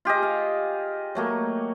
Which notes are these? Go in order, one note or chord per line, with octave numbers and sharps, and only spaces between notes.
F4 G4 G#4 D#5
F5
F#3 A3 A#3